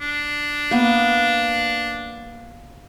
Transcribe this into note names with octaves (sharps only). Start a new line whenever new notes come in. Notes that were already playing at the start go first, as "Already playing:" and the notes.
D4
A#3 B3